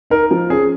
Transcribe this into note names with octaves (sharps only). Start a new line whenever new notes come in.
D#4 A#4
F3
C#4 G#4